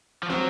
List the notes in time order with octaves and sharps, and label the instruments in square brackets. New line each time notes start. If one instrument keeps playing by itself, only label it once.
[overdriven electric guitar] F3
[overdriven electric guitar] F#3 [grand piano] C4